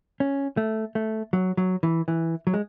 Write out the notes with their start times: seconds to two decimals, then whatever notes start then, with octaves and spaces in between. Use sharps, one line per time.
0.20 C#4
0.57 A3
0.95 A3
1.33 F#3
1.57 F#3
1.83 E3
2.08 E3
2.47 F#3
2.54 G#3